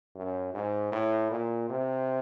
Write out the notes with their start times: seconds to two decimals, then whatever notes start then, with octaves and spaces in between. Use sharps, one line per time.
0.16 F#2
0.54 G#2
0.92 A2
1.31 A#2
1.70 C3